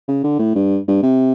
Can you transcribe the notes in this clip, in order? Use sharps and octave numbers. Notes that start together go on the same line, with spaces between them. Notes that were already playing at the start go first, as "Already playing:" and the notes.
C#3
D3
A2
G2
G2
C3